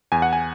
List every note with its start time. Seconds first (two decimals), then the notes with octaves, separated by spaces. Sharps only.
0.12 E2 G#5
0.22 F#5
0.33 G#5